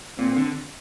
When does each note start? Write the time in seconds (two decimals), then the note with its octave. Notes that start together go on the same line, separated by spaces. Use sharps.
0.18 A#2 C4
0.36 D3